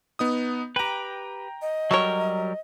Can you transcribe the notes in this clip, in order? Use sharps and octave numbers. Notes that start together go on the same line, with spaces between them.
B3 D#4 D#6
G4 B4 G5 A#5
D#5
F#3 G3 F#4 A4 A#4 C#5